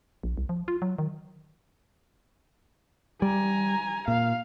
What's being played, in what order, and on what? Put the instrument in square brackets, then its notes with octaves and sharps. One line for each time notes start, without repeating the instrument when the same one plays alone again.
[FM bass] A#1
C2
F3
F4
F#3
D#3
[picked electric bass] G3 [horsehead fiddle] G#5 A#5
[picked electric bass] A#2 [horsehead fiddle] F5